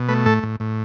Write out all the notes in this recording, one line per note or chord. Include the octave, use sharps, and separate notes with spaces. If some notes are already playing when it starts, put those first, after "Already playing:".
Already playing: B2
A3 B4
A2 A4
A2
A2